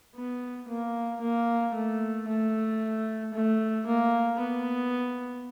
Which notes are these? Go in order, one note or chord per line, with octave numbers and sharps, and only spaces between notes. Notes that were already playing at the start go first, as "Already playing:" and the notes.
B3
A#3
A#3
A3
A3
A3
A#3
B3